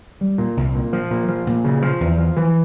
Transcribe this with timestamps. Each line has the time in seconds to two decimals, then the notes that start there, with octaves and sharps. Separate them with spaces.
0.21 G3
0.38 A#2
0.57 C2
0.75 A#2
0.93 F3
1.11 A#2
1.28 F3
1.47 A#2
1.64 C#3
1.82 F3
2.00 E2
2.18 F3
2.37 E3